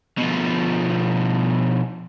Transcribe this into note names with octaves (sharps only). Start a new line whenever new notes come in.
B2 F3